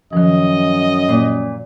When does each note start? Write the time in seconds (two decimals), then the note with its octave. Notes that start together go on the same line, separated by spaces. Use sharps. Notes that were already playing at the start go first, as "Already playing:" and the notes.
0.13 F#2 D#3 F3 D#5
1.09 A#2